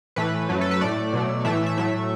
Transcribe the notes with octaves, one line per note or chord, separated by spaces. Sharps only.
A2 E3 A3 B4
F#2 F#3 A3
A4
B4
A2 A3 D5
B2 F#3 A3
A2 E3 A3 E5
E5
A2 F#3 A3 E5